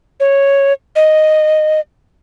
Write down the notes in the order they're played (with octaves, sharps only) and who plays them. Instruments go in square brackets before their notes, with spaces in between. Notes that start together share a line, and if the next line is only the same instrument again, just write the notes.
[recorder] C#5
D#5